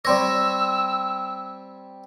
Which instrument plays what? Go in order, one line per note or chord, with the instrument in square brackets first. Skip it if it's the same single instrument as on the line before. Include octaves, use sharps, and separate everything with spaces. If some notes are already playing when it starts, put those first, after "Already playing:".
[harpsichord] G3 C4 C#5 [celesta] D5 C6 A#6 [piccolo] E6